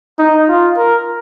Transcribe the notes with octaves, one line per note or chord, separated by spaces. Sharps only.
D#4
F4
A#4